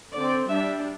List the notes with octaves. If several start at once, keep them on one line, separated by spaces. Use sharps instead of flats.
D3 C4 D5
G3 D4 E5